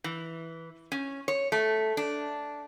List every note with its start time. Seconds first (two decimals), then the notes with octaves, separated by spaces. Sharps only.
0.04 E3
0.92 C#4
1.28 C#5
1.52 A3
1.97 D4